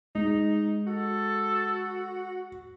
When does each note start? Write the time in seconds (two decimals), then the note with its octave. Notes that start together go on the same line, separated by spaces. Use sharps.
0.15 G#3 D#4
0.87 F#4 A4